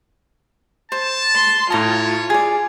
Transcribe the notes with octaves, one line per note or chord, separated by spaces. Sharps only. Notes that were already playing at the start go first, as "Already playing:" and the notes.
C5 A5
C6
A2 F4 C#5 A5 A#5 D#6
G#4 D5 G#6